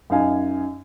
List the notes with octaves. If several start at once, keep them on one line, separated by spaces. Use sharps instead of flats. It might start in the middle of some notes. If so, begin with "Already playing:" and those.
F#2 D#4 F5 G#5